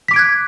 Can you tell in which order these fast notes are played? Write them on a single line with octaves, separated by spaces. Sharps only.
B6 D6 D7 G#6 F#6